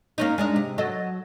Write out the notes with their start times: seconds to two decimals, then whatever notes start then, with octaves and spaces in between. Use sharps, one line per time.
0.18 A#3 C#4 D#4
0.38 G#3 D4 D#4
0.56 C3
0.78 F#3 A4 D#5